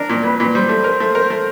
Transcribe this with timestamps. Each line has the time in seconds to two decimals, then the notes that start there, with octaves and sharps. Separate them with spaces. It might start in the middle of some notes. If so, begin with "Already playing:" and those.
Already playing: D4 A#4
0.09 A#2
0.24 A#2 B4
0.39 A#2 B4
0.55 G3 C5
0.69 A3
0.84 A#4
1.00 A3
1.15 A#4
1.30 A3